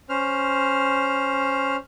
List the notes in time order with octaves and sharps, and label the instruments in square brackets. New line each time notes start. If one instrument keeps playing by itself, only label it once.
[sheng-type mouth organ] C#4 C5 F6